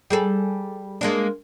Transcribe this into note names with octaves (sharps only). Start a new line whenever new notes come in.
G3 G#4 A4
G#3 A#3 D4